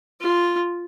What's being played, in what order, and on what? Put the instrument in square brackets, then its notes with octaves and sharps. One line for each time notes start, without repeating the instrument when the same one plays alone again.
[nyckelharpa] F4